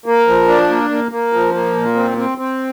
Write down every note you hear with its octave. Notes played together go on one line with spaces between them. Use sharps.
A#3
F3
D4
A#3
A#3
A#3
F3
A#3
A#2
C4
C4
C4